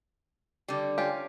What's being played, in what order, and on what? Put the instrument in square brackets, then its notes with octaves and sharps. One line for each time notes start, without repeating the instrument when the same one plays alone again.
[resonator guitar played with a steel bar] D3 G3
[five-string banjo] C#4 F4 G4